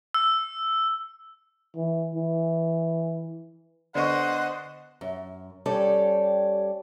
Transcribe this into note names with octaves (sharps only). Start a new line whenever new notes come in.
E6
E3
E3
D3 B3 C5 D5 D#5 F#5 C#6
F#2
G3 C#4 G4 A4 C#5 D5